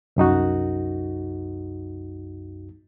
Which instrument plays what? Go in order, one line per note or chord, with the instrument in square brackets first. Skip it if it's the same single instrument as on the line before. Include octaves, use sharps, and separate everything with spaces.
[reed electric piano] C2 F#2 D#4 F#4